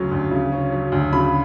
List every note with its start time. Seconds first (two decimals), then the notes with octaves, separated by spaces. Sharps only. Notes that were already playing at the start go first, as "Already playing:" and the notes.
Already playing: D2 C#3 F#3 C#4
0.12 D2
0.32 C#3
0.52 C#4
0.72 F#3
0.92 D2
1.12 C#3 B5